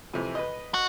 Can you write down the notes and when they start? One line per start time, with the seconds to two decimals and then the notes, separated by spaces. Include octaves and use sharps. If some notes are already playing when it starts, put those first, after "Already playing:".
0.14 F2 C3 E3
0.35 B4 D#5
0.74 F#4